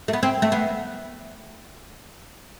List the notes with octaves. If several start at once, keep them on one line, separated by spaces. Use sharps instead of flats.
A3
B3
C4
A3
B3